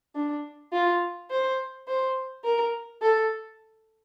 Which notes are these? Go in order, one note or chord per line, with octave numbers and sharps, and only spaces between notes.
D4
F4
C5
C5
A#4
A4